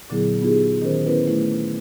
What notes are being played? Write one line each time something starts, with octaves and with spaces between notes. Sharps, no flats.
A#2 D3 F#3 B3 E4 G#4
B3 D#4 F4 G4 G#4
D#3 C#4 A#4 C5
B3 C#4 E4 A#4 B4
A3 E4